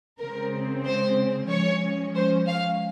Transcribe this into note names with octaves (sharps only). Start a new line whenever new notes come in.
C#3 G#3 C4 A#4
C5
F3 G#3 C#4 C#5
C5
F5